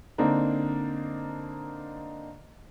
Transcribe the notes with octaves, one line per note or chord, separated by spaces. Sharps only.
D3 A#3 C4 D4 D#4